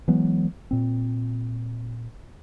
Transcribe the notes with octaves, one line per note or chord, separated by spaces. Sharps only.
E3 F#3 G#3 B3
A#2 C4